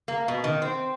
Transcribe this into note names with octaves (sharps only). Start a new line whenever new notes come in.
A#3
B2
D#3
C4